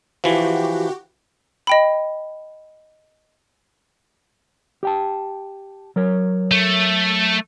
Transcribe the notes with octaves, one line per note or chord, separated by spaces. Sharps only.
E3 F3 F#4 G4
D#5 G5 B5
G4 G5 A5
F#3 A#4 C#5
A3